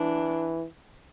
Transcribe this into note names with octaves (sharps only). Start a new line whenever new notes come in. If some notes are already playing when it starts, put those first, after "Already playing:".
Already playing: E3 D4